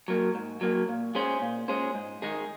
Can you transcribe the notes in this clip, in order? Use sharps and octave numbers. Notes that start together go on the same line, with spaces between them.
F#3 A#3
G#2
F#3 A#3
A#2
G#3 C#4 G#4 C5
A#2
G#3 C#4 G#4 C5
G#2
D#3 G#3 D#4 G#4